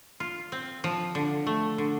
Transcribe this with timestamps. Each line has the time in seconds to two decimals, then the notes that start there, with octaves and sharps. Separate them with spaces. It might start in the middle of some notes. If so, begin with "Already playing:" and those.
0.20 F4
0.52 C4
0.84 F3
1.15 D3
1.47 A3
1.78 D3